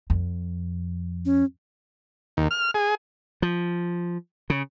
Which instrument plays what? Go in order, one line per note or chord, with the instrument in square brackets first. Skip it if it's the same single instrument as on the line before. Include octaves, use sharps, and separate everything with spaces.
[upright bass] F2
[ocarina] C#4
[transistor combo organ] D#2
F6
G#4
[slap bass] F3
C#3